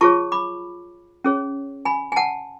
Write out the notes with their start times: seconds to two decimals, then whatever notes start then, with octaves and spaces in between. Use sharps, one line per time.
0.01 F4 G#4 C#5 A5 C#6
0.32 B5 D6
1.24 C#4 G#4 C#5
1.85 G#5 B5
2.12 G#5
2.16 F#5 A5